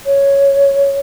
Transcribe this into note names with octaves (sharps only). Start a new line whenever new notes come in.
C#5